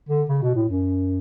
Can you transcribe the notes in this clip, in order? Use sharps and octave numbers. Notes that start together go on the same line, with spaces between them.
D3
C#3
B2
A2
F#2